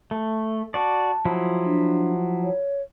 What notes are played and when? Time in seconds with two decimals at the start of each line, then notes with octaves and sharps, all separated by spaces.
0.11 A3
0.74 F#4 D5 A5
1.25 F3 F#3 E4
1.65 D4
2.43 C#5